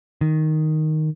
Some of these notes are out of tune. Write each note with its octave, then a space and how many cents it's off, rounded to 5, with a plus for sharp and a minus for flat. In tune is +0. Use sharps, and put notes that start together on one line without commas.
D#3 +0